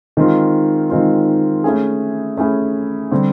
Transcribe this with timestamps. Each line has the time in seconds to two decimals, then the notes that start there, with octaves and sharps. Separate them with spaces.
0.17 D#3 G#3 C4 F4
0.90 D#3 G#3 C4 F4
1.64 A3 C#4 E4 G#4
2.37 A3 C#4 E4 G#4
3.11 D3 G3 C4